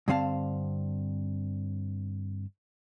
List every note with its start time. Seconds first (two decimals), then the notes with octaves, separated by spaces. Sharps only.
0.08 G2 D3 C4 F5 A5